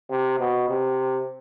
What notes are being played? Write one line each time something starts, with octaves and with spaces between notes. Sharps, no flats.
C3
B2
C3